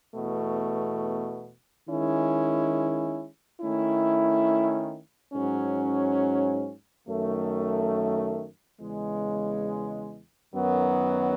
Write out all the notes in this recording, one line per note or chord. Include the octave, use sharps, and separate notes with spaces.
E2 B2 A3
D#3 G#3 C#4 E4
D#3 A3 C#4 E4
G#2 F#3 C#4
F#2 D#3 A3
E2 C#3 G#3
F#2 D#3 F#3 B3